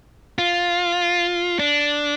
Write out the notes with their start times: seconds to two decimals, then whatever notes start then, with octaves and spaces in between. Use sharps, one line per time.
0.39 F4
1.59 D4